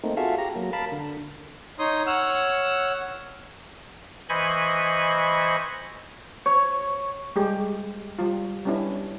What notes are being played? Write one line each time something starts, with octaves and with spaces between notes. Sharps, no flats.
A3 A#3 C4 D#4
F4 F#4 G#4 A4 E5 F5
G4 A#5
F#3 A#3
A#4 F5 A5 B5
D3
D#4 C#5 C6 D#6
C#5 F#5 E6 F6
E3 C5 D#5 G#5 B5 C#6
C#5
G3 G#3 G4
G3 F4
G3 B3 C#4 D4 E4